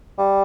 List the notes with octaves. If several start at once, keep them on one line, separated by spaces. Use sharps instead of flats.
G3